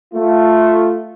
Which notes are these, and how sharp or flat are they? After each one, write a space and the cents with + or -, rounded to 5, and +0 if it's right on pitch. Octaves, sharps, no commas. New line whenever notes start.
A3 +0 F4 +0